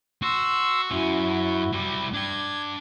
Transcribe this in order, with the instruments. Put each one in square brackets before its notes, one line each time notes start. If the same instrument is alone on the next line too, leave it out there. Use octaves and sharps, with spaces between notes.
[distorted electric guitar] F#4 [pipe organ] C6 E6
[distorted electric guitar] F#2 C#4 [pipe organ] E4 F#4
[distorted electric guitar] G3 E4
[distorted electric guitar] D4 G5 [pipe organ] G#6